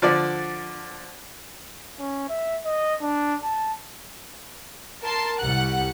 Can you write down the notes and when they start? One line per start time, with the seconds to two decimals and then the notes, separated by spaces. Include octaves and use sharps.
0.02 D3 F3 D5 D6
1.99 C#4
2.29 E5
2.65 D#5
3.02 D4
3.43 A5
5.02 A#4 A5 C6
5.40 C2 G3 F#5 F#6